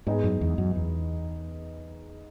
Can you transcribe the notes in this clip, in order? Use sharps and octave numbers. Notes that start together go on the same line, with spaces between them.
G#2 G#3 B3 D#4 G#4
F#2
E2
F#2
E2